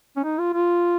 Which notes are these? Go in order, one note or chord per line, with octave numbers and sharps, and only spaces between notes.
C#4
D#4
F4
F4